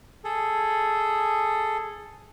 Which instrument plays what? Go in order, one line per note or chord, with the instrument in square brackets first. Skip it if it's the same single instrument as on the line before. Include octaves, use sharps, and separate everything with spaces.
[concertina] G#4 A4